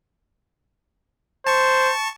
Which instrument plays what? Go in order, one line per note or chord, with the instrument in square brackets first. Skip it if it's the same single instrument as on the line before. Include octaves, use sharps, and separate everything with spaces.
[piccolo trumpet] C5 [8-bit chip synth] A5 C#6